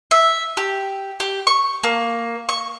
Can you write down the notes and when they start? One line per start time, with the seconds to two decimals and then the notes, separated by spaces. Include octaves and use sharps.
0.11 E5
0.57 G4
1.20 G4
1.47 C#6
1.83 A#3
2.49 C#6